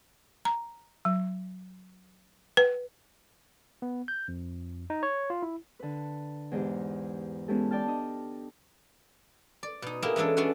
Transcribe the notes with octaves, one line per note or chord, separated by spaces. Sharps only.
A#5
F#3
B4
B3
G6
F2
D#4
C#5
F4
E4
D3 B4
E2 G#2 D#4 G4
G#3 B3 C#4 E4 G4 A4
D5 G5 A5 F6
D4 D#5
D5
B2 D#4
A#3 E4 G4 G#4 A#4
E3 G#3 C#4 D4 A4
B3 C#4 D4 F#4 A4 B4